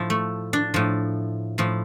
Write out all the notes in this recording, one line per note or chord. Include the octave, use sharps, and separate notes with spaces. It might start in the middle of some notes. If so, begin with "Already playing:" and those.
Already playing: A2 F3
A3
D4
A2 F3
A2 F3